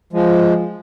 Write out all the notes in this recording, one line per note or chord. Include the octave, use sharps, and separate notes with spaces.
F3 G#3